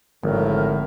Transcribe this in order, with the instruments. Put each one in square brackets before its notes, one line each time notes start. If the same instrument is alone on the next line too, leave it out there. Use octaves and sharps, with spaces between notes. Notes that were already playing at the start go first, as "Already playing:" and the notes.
[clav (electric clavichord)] G#1 [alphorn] A2 [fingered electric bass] D3 F3 G#3 [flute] A#4